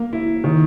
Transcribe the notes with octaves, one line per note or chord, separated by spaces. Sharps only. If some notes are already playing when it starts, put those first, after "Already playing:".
Already playing: A#3
E4
D#3